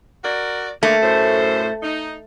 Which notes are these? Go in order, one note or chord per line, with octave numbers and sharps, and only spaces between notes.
F#4 A#4 D5
D3 A3 A#3
F#2 A2 C5
D#4